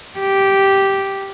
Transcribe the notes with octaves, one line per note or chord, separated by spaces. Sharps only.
G4